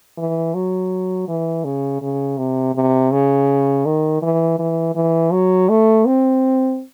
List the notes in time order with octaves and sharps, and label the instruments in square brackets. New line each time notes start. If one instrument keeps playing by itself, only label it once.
[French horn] E3
F#3
E3
C#3
C#3
C3
C3
C#3
D#3
E3
E3
E3
F#3
A3
C4